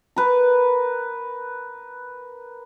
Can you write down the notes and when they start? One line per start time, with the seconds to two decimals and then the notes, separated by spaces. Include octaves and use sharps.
0.16 A#4 B4